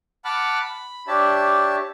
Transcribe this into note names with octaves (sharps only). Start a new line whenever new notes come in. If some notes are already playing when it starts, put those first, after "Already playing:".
F#5 A5 B5 D6 F6 F#6
B5
D4 G4 C#5 E5 A5